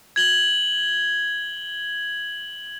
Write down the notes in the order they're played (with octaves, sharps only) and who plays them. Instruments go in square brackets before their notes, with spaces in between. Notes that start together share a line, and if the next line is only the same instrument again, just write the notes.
[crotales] G#6 F#7 G7